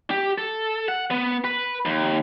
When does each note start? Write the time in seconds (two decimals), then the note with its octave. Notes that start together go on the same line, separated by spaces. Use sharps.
0.11 G4
0.38 A4
0.88 F#5
1.11 B3
1.45 B4
1.85 D#2